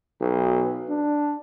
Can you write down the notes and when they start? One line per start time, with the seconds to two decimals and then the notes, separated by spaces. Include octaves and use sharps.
0.21 B1
0.89 D4